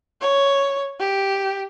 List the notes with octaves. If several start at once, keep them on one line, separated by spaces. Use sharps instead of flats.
C#5
G4